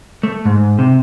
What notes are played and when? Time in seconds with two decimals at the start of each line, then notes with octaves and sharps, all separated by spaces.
0.23 A3
0.45 G#2
0.79 C3